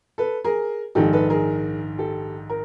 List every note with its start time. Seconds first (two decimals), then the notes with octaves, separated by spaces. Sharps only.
0.18 A4 B4
0.44 G#4 A#4
0.95 A#1 G#2 D#3 G4 A4
1.13 A4 B4
1.30 G#4 A#4
1.98 G4 A4
2.50 A#4